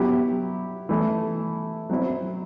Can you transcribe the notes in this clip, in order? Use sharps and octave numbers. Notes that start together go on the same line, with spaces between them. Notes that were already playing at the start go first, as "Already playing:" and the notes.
Already playing: F#3 B3 E4 G4
E3 A3 E4
F#3 C4 E4